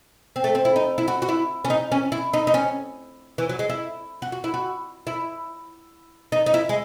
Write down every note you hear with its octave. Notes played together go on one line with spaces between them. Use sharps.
C4
A3
C4
E4
D#4
E4
F#4
F#4
E4
C#4
D#4
C#4
E4
D#4
D#4
C#4
E3
F#3
G#3
E4
F#4
F#4
E4
F#4
E4
D#4
D#4
E4
G#3